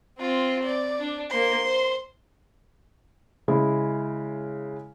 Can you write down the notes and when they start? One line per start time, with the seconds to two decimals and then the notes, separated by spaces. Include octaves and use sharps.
0.19 C4 F4
0.63 D5
1.00 D4
1.30 A#3 C5 C6
1.65 C5
3.48 C#3 G#3 E4